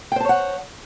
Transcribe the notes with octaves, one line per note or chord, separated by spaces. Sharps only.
C5 C#5 F#5 G5 A5